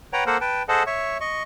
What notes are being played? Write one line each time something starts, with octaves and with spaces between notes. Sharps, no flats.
B4 C#5 F#5 G5 A#5
A#3 A4 A#4 C5 F#5
B4 G5 A5
G#4 A4 C5 D#5 F#5 A5
C#5 E5 C#6
D#5 C#6